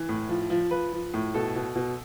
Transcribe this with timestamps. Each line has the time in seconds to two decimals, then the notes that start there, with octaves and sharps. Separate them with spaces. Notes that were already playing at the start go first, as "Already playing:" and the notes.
Already playing: E3
0.09 A2
0.29 F3
0.50 F3
0.71 F3 B4
0.93 F3
1.14 A2
1.34 B2 A4
1.55 B2
1.75 B2